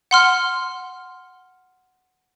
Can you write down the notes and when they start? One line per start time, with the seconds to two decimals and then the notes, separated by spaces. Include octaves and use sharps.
0.11 F#5 C6 F6